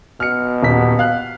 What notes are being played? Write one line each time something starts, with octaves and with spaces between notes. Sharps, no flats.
B2 F6 C#7
D#1 B6
F5 F#6